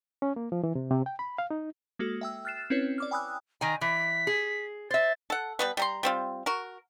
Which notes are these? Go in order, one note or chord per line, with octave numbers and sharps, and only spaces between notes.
C#4
A#3
F3
E3
C3
C3
G5
B5
F5
D#4
G#3 A#3 F#4 A4
E5 G5 E6
F6 F#6 A6 C7 E7
C4 C#4 E4 B4 C#5
D5 D6 F6
G5 G#5 B5 D#6 E6 F#6
D#3 G#5 A#5
E3 B6
G#4
C5 E5 A6
A4 F#5
G3 B3 B4
G3 A#5 C6
G3 C4 F4
F#4 A#4